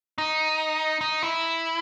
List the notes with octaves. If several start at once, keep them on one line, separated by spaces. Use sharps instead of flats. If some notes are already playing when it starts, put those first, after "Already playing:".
D#4
D#4
E4